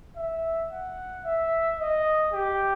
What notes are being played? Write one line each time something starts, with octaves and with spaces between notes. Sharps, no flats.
E5
F#5
E5
D#5
G4